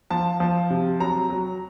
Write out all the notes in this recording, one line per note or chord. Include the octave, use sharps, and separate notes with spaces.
F3 A5
F3
C3
F#3 A#5
F#3